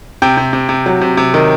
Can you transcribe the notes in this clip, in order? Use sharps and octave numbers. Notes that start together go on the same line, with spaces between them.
C3 G5
C3
C3
C3
F#3
C3
C3
D#3